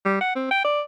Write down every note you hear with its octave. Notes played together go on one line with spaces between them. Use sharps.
G3
F#5
C4
G5
D5